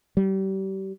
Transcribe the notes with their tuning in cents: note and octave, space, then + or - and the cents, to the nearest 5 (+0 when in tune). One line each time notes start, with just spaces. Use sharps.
G3 -30